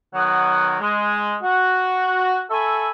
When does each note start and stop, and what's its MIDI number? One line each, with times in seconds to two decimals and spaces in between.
0.14 0.75 51
0.14 0.75 54
0.14 0.75 59
0.14 0.75 78
0.14 0.75 87
0.80 1.35 56
1.43 2.42 66
2.49 2.89 69
2.49 2.89 76
2.49 2.89 80
2.49 2.89 83
2.49 2.89 85